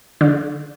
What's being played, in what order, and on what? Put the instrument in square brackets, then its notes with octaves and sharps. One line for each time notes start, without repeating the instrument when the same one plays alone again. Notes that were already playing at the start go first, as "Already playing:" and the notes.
[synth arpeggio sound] D3